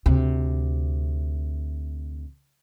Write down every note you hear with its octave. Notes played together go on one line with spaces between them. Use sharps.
D2 C3